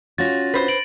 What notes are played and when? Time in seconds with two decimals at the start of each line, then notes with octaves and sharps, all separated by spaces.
0.18 C#4 F4 F#4 A6 A#6
0.54 B4 C5
0.68 D7 F#7